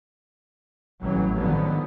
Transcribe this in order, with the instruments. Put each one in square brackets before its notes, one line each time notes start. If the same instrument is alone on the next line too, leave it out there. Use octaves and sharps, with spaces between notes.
[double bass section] A1 E3 F#3
D3 D#3 F3 F#3 B3